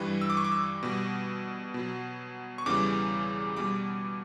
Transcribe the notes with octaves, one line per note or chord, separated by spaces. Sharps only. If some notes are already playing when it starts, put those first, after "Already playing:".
Already playing: G2 E3 G3
E6
D6
C#6
D6
E6
B2 G3
B2 F#3
C#6
E2 C#3 E3 G3 D6
B2 G3 D6